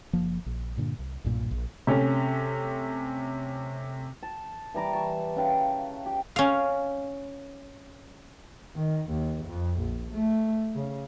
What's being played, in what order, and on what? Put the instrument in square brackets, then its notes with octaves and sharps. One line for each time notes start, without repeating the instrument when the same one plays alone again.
[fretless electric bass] F#1 F3 A#3
A#1
G2 A#2 D3
C2
B1 G2 A#2
A#1
[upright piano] C3 A3 C#4
[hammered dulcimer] A5
E3 G3 A#5 D6
A5 C#6
C#3 B4 F5 G5
G4
[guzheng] C#4 F5
[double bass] D#3
D#2
F2
A#1
A3
C#3